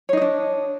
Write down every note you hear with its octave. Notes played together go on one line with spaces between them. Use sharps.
D4 D#4 C#5 D#5